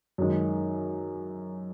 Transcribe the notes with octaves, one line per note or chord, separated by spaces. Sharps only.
F#2 D#3 G#3